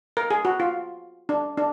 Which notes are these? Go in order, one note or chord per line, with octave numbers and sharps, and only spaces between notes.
A#4
G#4
F#4
F4
D4
D4